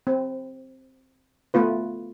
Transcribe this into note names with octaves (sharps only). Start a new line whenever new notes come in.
C4
A3 B3 F4 B4